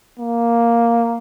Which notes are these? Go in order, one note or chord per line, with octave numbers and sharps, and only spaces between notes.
A#3